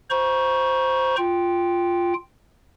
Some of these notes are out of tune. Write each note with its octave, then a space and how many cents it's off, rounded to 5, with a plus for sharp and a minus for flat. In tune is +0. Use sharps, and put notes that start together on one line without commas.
C5 +0 A#5 +35 C#6 +0
F4 +0 G5 +0